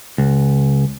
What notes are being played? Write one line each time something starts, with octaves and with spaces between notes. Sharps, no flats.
C#2